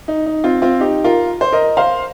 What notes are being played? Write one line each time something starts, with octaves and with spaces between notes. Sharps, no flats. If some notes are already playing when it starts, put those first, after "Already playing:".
D#4
D#4
C4 F4
C4 F4
D#4 G4
F4 A#4
C5
A#4 D#5
C5 F5